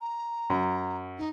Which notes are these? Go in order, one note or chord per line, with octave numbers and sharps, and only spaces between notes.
A#5
F#2
D#4